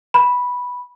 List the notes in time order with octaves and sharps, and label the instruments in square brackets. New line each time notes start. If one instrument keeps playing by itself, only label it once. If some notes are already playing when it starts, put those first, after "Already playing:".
[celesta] B5